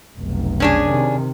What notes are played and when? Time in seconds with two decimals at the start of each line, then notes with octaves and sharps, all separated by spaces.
0.19 F1 B1
0.60 C#4 D4 G#4
0.90 C3 D#3